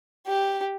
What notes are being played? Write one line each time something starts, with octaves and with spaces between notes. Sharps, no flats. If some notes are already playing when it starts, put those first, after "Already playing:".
G4